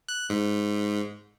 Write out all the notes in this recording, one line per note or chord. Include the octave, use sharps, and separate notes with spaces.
F#6
G#2